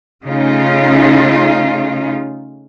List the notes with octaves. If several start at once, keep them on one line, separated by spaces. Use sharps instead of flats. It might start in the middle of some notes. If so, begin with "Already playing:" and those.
C#3 A3 D#4 F4